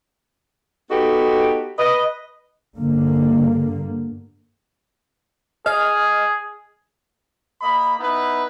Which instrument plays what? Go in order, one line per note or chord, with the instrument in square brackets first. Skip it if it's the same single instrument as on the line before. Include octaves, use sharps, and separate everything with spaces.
[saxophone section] B3 D#4 F#4 G4 A4
B4 D#5
[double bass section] G2 D3 A#3
[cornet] G#4 [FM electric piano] D#5 F6
[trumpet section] A#3 D#5 B5
B3 D#4 E4 B4